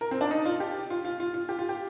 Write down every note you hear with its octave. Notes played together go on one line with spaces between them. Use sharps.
A#4
C4
D4
D#4
F4
G4
F4
F4
F4
F4
G4
F4
G4